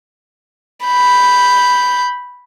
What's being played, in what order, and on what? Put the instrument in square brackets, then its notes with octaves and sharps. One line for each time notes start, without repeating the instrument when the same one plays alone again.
[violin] B5 G6